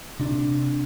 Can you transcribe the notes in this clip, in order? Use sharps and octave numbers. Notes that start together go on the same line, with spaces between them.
C3 D4